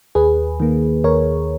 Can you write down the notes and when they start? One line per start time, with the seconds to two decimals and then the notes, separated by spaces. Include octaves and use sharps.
0.15 D#2 G#4 B4
0.60 D#3 A#3
1.04 D#2 A#4 C#5